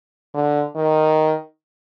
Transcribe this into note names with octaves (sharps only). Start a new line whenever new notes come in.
D3
D#3